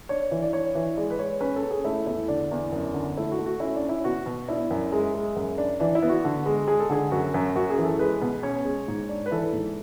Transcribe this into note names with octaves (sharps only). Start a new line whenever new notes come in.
D4 C#5
E3
D5
D4 C#5
E3
G#3 D5
B4
G#3 C#5
C#4 B4
A4
C#4
G#4
A3 E4
E2 E4
D3 D4
E2
F#2
D3
A3 E4
F#4
A3
F#4
C#4 E4
D4
C#4
E4
B2 F#4
B2
D4 E4
F#2
G#3
G#3
F#2
D4
E3 D4
E4
B3
F#4
D3
G#3
G#3 G#4
A4
D3 G#4
F#2 F#4
F#2
F#2 F#4
G#4
E3
A4
G#3 B4
B2
C#4 C#5
G#3
G#2
D4
B4
E3 A4
G#2